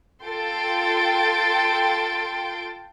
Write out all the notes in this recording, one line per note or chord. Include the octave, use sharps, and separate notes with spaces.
F4 A4 G5 C6 A6 D7